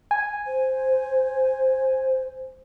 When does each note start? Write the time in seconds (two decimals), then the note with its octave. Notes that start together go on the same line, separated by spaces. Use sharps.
0.11 G#5
0.47 C5